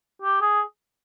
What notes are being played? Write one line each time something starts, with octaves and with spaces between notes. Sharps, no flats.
G4
G#4